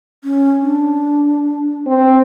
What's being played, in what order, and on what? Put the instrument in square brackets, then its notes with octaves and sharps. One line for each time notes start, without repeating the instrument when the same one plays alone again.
[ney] C#4
D4
[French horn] C4